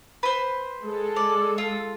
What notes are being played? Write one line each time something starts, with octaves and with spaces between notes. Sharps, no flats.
B4 C5
G#3 A4
D5
F4